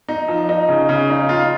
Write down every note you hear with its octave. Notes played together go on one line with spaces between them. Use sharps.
D#4
F3
D#4
C#3
C#3
D#4
F4